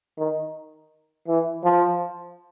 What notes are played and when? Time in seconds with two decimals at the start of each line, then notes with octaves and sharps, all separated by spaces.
0.18 D#3
1.28 E3
1.64 F3